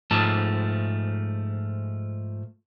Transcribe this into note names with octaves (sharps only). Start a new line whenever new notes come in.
G#2 F3 A3 A5